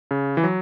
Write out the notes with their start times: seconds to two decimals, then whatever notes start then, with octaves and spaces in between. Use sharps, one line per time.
0.11 C#3
0.37 E3
0.43 F#3